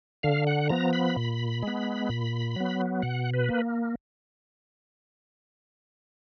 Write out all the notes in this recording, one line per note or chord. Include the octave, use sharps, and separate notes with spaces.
D3 F5
F#5
F3 B3 A#5
B5
A#2
G#3 B3
A#2
F#3 B3
B2 F#5
B4
A#3